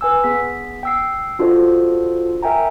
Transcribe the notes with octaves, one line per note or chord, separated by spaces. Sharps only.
B4 G#5 E6
B3 G#4 B6
G5 E6 C7
D4 F4 F#4 A4 C5 D#5
A#4 E5 G5 G#5 A#5